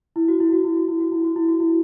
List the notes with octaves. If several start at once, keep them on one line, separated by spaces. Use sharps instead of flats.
E4
F#4
E4
F#4
E4
F#4
E4
F#4
E4
F#4
E4
F#4
E4